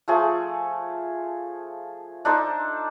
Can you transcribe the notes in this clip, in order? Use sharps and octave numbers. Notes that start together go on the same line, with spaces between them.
F3 A3 G#4
D4 D#4 A4 C5